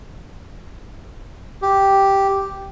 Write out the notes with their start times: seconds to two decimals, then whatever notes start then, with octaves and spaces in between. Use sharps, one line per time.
1.62 G4